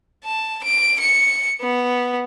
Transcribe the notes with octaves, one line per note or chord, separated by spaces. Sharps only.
A5
D7
C#7
B3